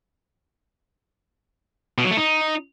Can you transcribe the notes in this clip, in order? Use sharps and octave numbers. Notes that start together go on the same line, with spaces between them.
B2
F#3
A3
D#4